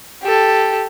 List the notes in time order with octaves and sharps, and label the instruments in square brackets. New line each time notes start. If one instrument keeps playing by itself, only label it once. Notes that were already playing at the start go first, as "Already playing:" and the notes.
[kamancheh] G4 A4